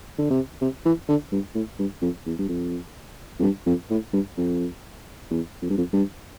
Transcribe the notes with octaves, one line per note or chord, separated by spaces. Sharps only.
D3
C3
C3
E3
D3
G2
A2
G2
F2
E2
G2
F2
F2
G2
F2
A2
G2
F2
E2
F2
G2
F2
G2